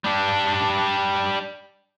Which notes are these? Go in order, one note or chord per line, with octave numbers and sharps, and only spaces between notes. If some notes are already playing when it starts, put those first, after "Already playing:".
G3 D4